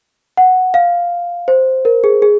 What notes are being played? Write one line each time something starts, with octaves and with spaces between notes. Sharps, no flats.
F#5
F5
C5
A#4
G#4
G#4